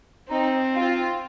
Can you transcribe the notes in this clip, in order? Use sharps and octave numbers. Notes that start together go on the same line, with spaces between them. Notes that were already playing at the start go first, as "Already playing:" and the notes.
C4 D#4
F4